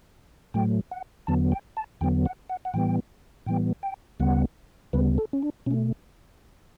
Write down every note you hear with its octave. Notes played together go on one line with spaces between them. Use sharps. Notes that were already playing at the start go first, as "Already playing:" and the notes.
A2 F#3 A3 G5
F#5
E2 D3 F#3 B3 A5
G5
A5
E2 D3 F#3 B3 G5
F#5
F#5
F#5
A2 E3 G3 B3 G5
A2 E3 G3 B3 G5
G5
D2 C#3 G3 B3 F#5
D2 C#3 G3 B3 B4
A4
C#4
D4
B2 A3 C#4